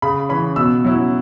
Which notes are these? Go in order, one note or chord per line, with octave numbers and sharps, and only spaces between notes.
C#3 B5
E3 C#4 B5
B2 E6
F#3 C#4 E4